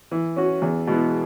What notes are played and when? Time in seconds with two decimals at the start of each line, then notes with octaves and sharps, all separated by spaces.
0.11 E3
0.36 C#4 F#4
0.62 E2
0.87 B2 G#3 B3 E4